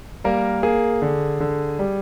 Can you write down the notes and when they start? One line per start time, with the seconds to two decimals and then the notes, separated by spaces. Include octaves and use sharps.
0.24 G3 A#3 A#4
0.63 A#3 G#4
1.02 D3
1.40 D3
1.79 G3